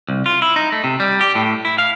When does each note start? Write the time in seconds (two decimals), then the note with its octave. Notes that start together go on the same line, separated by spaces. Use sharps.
0.09 C2
0.26 F4
0.42 E4
0.56 D#4
0.72 A3
0.84 C3
1.00 G3
1.21 G4
1.35 A2
1.65 E4
1.78 F5